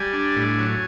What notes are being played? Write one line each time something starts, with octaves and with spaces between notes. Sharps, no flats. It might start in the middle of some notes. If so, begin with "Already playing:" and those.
Already playing: G3 G#5
D4
A2
F#3